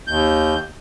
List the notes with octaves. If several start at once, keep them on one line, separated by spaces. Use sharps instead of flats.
D#2 G6